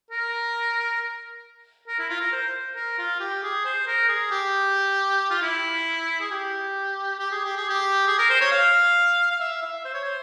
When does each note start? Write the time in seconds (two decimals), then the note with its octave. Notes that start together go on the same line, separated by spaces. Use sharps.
0.11 A#4
1.88 A#4
1.99 E4
2.10 F4
2.21 A#4
2.32 C5
2.76 A#4
2.98 F4
3.20 G4
3.43 G#4
3.65 C5
3.87 A#4
4.08 G#4
4.31 G4
5.31 F4
5.42 E4
6.20 G#4
6.31 G4
7.19 G4
7.31 G#4
7.44 G4
7.57 G#4
7.69 G4
8.07 G#4
8.18 A#4
8.30 C5
8.41 C#5
8.51 F5
9.31 F5
9.40 E5
9.62 E5
9.85 C5
9.94 C#5
10.04 C5